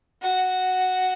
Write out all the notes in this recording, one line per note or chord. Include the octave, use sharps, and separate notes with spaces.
F#4